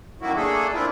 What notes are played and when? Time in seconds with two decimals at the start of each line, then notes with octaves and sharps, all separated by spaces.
0.21 F#2 D#3 F#3 A#3 E4 F#4
0.36 A3 A#3 D4 G#4 A4
0.74 A#3 C4 D4 E4 F4